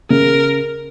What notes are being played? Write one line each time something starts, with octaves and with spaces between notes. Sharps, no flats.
C#3 A#4